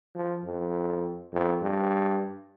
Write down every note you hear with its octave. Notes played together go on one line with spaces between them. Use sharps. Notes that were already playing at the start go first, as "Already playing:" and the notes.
F3
F2
F2
G2